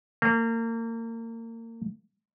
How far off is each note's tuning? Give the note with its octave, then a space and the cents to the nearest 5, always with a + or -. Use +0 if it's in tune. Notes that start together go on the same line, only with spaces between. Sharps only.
A#3 -35